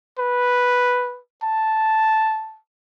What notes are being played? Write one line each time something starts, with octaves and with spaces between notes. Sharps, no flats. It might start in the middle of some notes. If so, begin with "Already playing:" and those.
B4
A5